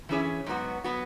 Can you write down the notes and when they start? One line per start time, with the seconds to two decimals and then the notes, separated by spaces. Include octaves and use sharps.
0.09 E3 C#4 E4 G#4 C#5
0.46 G#2 F#3 B3 F#4
0.84 F#3 B3 F#4